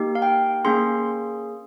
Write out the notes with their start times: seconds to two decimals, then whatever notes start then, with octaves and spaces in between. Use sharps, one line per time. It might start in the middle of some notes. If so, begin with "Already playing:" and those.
Already playing: A#3 D#4 G4
0.15 F5
0.22 G5
0.65 A#3 C#4 G#4 C6